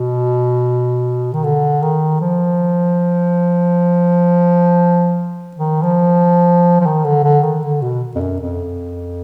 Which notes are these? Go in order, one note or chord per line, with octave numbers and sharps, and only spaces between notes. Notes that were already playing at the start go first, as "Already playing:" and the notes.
Already playing: B2
D#3
D3
D#3
F3
D#3
F3
F3
D#3
D3
D3
D#3
D3
B2
F2
F#2
F2